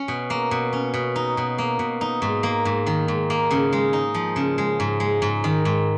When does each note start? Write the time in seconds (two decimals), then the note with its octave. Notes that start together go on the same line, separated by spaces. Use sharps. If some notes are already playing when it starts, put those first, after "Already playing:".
Already playing: C#4
0.08 B2
0.30 A#3
0.51 B2
0.73 C#4
0.94 B2
1.16 D#4
1.37 B2
1.58 A#3
1.79 B2
2.01 D#4
2.22 G#2
2.43 A#3
2.65 G#2
2.86 D#3
3.08 G#2
3.30 A#3
3.51 C#3
3.73 G#3
3.93 D#4
4.15 F3
4.36 C#3
4.58 G#3
4.80 G#2
5.00 G#3
5.22 G#2
5.44 D#3
5.65 G#2